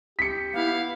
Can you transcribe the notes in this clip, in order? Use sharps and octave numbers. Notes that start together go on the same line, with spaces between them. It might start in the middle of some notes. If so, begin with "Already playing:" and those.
G4 B6 C#7
B3 E4 F5